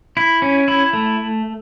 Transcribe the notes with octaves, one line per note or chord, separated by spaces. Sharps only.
E4
C#4
E4
A3